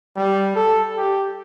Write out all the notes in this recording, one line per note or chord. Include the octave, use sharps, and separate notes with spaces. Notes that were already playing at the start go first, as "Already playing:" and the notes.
G3
A4
G4